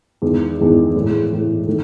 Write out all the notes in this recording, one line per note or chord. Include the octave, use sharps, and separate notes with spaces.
E2 D#3 G#3
E2 D#3 G#3
A2 E3 G#3
A2 E3 G#3
D#3 A3